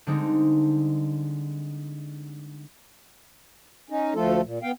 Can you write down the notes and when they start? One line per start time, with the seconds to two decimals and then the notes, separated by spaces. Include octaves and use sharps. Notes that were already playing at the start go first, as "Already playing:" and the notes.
0.07 D3 G3 G#3 C4 D#4
3.90 C#4 D#4
4.15 D2 F3 A3 F4 A4
4.43 A#2
4.63 B3 F5 G5